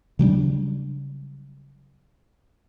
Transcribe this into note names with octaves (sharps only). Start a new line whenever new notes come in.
C#3 F#3 G3 D4